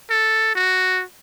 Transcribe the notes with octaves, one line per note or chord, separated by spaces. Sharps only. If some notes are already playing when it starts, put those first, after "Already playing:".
A4
F#4